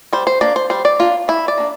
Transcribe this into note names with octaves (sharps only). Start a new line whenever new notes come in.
G3 C5
C5
A#3 D4 D5
C5
G3 C5
D5
A#3 D4 F4
E3 E4
D5
A#3 D4